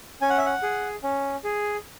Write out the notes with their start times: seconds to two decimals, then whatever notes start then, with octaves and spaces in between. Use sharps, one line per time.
0.21 C#4 G#5
0.30 F#5
0.38 E5
0.46 F#5
0.63 G#4
1.03 C#4
1.44 G#4